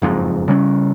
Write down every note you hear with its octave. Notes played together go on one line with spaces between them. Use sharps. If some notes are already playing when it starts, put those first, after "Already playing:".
F#1 F2 G#2
C#3 G3 B3 C#4